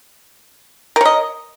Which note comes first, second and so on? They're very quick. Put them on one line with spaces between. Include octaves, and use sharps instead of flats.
A#4 C#5 D#5